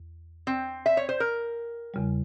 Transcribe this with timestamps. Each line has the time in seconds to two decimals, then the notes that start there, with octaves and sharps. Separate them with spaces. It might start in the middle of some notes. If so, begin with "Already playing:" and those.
Already playing: E2
0.47 C4
0.86 E5
0.97 C#5
1.09 C5
1.20 A#4
1.94 E2 C#3 G3